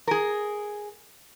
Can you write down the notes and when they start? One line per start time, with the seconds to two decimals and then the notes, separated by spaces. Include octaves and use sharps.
0.07 G#4 A#4